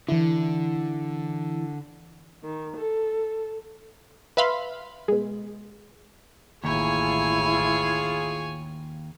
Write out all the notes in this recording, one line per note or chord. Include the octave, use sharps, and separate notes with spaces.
D3 E3 E4
D#3
A4
B4 E5 F5 B5 C6
B2 G#3
A1 D#2 E4 F4 G#4 C#5 G#5